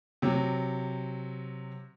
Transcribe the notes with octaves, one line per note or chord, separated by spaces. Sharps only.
C3 F#3